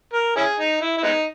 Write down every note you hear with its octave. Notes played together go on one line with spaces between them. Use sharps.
A#4
C#4 E4 G#4
D#4
E4
E4
G#3 B3 D#4